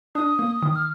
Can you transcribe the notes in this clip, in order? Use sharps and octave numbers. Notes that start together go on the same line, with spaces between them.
D4 D#6
A#3
D#3
F6